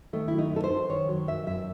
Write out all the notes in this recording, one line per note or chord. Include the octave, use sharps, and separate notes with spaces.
D#3 A3
E4
F#3
D#4
F#2 A4
C5
F#2
D#3 C#5
F#3
F#2 E5
F#2 E5